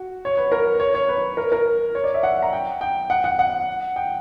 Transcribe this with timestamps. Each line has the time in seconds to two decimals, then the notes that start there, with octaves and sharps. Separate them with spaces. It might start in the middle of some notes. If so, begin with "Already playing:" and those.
Already playing: F#4
0.25 C#5
0.37 B4
0.52 A#4
0.80 C#5
0.95 C#5
1.09 B4
1.37 A#4
1.52 A#4
1.95 C#5
2.04 D5
2.14 E5
2.23 F#5
2.42 A#5
2.53 G5
2.81 G5
3.10 F#5
3.24 F#5
3.39 F#5
3.96 G5